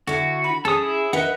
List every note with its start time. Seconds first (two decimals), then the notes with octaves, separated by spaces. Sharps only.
0.07 D3 E4 F#4
0.44 B5
0.65 C#4 G#4 A4 D#6
0.82 E4
1.13 D#4 A#4 B4 D#5 E5 F#5